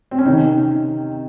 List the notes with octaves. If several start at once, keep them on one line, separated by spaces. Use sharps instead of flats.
C4
C#4
C3 D#3 D#4